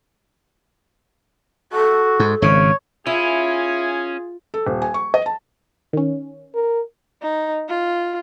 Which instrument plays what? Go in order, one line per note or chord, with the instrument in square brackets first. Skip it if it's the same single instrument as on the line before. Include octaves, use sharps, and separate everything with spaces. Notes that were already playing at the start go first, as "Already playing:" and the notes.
[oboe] F#4 [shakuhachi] A4
[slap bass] G#2
[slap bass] G#1 C#3 [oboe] C#5
[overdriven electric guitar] C#4 [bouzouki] E4 [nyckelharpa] F4 [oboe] G#4
[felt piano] A4
D#1
G#5
C#6
D#5
A5
[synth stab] D#3 C#4
[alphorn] A#4
[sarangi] D#4
F4